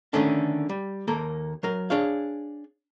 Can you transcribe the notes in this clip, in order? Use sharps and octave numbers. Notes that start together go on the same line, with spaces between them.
D3 D#3 A3 C#4 D4
G3
D#2 A#3 A4 A#4
F#3 A#4
D4 G#4 C#5 F5